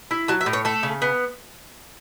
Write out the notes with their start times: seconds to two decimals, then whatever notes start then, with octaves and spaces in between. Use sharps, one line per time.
0.11 E4
0.28 F#3 A5
0.41 E5
0.46 A2
0.53 C#5
0.65 A3 A4
0.83 C#3
1.02 B3